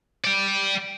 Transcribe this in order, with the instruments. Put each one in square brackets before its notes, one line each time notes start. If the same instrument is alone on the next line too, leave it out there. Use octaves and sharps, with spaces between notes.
[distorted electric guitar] D5 G5